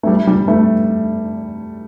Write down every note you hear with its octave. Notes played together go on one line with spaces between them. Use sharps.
A3
G3
G3
A3